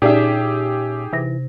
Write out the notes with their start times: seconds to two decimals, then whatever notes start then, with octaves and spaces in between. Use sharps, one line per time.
0.02 A#2 C#4 D#4 G4 G#4 E5
1.13 C3 E3 A#6